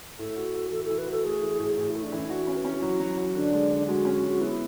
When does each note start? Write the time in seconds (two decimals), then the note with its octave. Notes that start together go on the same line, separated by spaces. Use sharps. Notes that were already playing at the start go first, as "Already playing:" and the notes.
0.19 A2 A4
0.36 F#4
0.54 F#4
0.71 E3 A4
0.85 E3 A4
0.98 B4
1.06 F#4
1.11 A4
1.24 A3 G#4
1.42 E3
1.59 A2
1.77 A2 G#4
1.90 A3 E4
2.03 D4
2.12 E3 C#4
2.25 E4
2.29 D4 F#4
2.43 C#4 E4
2.56 B4
2.65 C#4 F#4
2.82 F#3 E4
3.00 F#3
3.17 F#3
3.35 D3 D4
3.53 G#3
3.70 D3
3.88 G#3 F#4
4.05 C#4
4.24 G#3
4.29 F#4
4.40 B3 E4